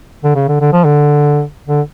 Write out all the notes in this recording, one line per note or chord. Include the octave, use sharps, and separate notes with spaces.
D3
C#3
D3
D3
F3
D3
D3